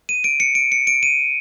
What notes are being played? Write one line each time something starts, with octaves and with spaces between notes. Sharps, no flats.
D#7
D7
C#7
D7
C#7
D7
D#7